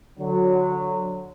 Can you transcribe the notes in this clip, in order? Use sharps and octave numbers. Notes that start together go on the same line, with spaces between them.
D3 F#3